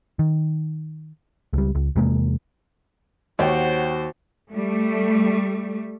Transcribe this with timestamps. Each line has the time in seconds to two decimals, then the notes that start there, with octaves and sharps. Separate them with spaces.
0.19 D#3
1.53 C#2 G3
1.75 C#2
1.96 E2 C3 G#3 A#3
3.39 D#2 F#4 C5 C#5 F#5 G5
4.50 G3 A3